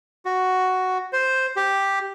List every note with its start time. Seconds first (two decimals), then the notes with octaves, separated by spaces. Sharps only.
0.25 F#4
1.13 C5
1.56 G4